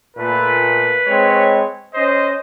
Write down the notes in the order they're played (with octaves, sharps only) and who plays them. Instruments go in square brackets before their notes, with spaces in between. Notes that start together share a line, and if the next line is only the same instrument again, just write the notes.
[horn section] A#2 A3 [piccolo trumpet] B4
[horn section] G#3 C4 C#5
[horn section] C#4 C5 [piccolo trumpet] D#5